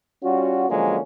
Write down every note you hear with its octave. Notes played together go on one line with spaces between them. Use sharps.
G3 C#4 F4 F#4
D3 F3 F#3 G#3 A#3 C#4